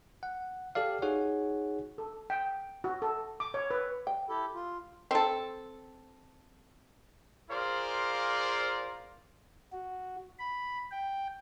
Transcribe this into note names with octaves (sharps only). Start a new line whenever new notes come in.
F#5
G4 A4 D5 F5
D#4 F#4 G#4 C#5 F#5
A4
G5
F#4
A4
D6
C#5
B4
G5
E4 G4 A4
F4
C4 A4
F4 G#4 A#4 C5 D5 F5
F#4
B5
G5